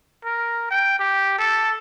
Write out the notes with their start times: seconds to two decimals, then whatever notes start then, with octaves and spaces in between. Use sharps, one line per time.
0.25 A#4
0.71 G5
0.99 G4
1.39 A4